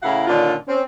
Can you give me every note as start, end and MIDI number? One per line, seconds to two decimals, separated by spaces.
0.03 0.27 45
0.03 0.27 49
0.03 0.27 64
0.03 0.27 70
0.03 0.27 77
0.03 0.27 78
0.27 0.54 46
0.27 0.54 50
0.27 0.54 51
0.27 0.54 61
0.27 0.54 62
0.27 0.54 65
0.67 0.80 60
0.67 0.80 61